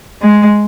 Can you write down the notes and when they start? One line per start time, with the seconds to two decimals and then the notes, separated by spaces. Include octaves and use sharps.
0.21 G#3